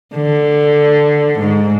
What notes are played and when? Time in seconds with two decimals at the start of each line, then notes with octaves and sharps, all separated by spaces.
0.14 D3
1.39 G#2